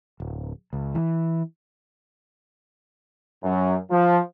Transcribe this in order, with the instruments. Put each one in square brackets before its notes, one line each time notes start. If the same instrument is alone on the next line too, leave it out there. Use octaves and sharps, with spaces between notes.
[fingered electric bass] D1
C#2
E3
[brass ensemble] F#2
F3